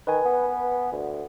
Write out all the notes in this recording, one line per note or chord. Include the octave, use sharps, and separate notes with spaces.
D#3 B4 G#5
B3
D2